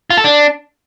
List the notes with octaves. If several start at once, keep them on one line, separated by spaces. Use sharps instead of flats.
F4
A4
D4